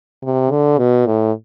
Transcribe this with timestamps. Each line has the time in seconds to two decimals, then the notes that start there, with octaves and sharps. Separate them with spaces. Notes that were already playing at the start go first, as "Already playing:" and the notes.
0.23 C3
0.51 D3
0.78 B2
1.07 A2